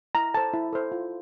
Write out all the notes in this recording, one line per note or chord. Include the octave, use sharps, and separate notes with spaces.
E4 A#5
A4 C5 A5
E4
A4 C5
F4